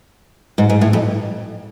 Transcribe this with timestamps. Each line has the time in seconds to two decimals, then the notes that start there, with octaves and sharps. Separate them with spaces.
0.58 G#2
0.70 G#2
0.81 A2
0.93 F2